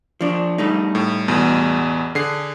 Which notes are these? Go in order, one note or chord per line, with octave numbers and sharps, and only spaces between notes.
F3 D4
G3 A3 D#4
A2
A1 E2 B2
D3 G#4 C7